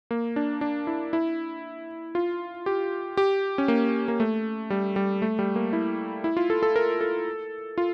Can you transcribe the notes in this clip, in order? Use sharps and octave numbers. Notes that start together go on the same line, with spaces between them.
A#3
D4
D4
E4
E4
F4
G4
G4
C#4
A#3
A#3
A3
G3
G3
A3
G3
A#3
E4
E4
F4
A4
A4
A#4
A4
F4